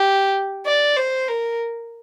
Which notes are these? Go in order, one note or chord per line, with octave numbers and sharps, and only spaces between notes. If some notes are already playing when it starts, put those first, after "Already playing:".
Already playing: G4
D5
C5
A#4